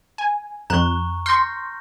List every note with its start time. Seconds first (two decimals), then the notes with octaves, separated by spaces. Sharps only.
0.18 G#5
0.70 F2 A#5 C#6 F#6
1.26 C6 C#6 F6 G6 A#6